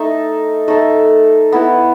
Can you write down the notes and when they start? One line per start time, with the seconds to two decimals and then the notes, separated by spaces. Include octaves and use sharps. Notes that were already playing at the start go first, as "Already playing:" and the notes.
Already playing: A3 D#4 A4 E5
0.68 A3 D#4 A4 E5
1.52 B3 E4 A4